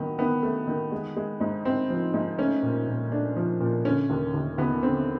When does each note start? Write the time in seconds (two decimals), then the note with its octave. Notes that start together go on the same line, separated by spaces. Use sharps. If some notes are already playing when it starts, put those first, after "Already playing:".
Already playing: D#3 F#3 B3
0.18 D#3 B3
0.43 A3
0.67 D#3
0.92 G#3
1.16 G#3
1.40 G#2
1.65 G#2 C4
1.90 F3
2.14 G#2
2.38 A3 C#4
2.63 A#2
2.87 A#2
3.12 A3 D4
3.36 F3
3.60 A#2
3.85 D3 C#4
4.10 D#2
4.34 D#2
4.58 D#2 B3
4.83 D3 C4